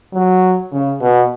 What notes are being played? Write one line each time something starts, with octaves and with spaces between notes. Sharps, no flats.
F#3
C#3
B2